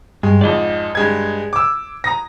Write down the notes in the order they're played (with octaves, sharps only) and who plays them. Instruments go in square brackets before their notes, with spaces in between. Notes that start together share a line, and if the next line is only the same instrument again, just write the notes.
[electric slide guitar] G2 [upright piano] G#3
[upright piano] F2 G#2 [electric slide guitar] D5 D#5
[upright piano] G2 G#3 G#6
D6 E6
A#5 D#6 A#6